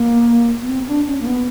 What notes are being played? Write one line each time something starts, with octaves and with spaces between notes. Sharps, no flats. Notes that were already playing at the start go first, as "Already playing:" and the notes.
Already playing: A#3
B3
C4
D4
C#4
A#3
B3